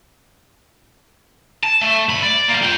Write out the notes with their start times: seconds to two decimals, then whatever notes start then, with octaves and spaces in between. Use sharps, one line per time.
1.64 A5
1.81 A3
2.09 D2 B5
2.23 D5
2.49 G3 A#3
2.62 F4 G5